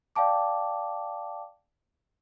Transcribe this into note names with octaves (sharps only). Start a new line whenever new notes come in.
D5 F5 G5 A5 D6